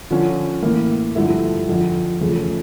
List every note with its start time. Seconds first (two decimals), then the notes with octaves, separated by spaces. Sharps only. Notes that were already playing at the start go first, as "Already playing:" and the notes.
0.10 D3 F3 C#4 F4
0.62 A2 E3 A#3 E4
1.15 G2 D3 F3 A3 E4
1.69 F2 D3 F3
2.21 E2 C#3 F3 A3 C#4